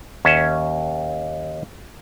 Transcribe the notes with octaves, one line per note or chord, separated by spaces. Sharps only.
D#2 C#4 E5